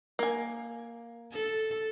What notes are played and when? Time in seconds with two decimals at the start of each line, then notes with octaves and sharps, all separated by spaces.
0.19 A#3 G#5
1.33 A4